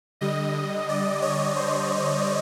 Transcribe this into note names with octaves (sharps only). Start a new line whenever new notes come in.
D3 G3 D#5
D5
C#5
C5